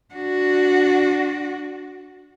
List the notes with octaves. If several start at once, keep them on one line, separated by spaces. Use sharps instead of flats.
D4 F#4